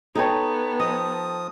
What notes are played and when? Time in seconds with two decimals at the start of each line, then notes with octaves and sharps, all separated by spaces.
0.15 B3 D#4 A4 C#5 G5 A5
0.80 F3 D#5 D#6